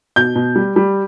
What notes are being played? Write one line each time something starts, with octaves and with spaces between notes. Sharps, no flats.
B2 G6
B2
G3
G3